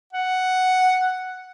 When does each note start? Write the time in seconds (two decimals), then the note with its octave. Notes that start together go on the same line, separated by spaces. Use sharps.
0.13 F#5